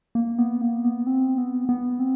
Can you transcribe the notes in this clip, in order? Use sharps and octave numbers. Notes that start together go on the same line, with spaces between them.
A#3
B3
A#3
B3
C4
B3
B3
C4